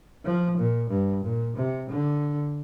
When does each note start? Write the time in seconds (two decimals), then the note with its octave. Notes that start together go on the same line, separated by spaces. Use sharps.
0.25 F3
0.57 A#2
0.90 G2
1.24 A#2
1.56 C3
1.90 D3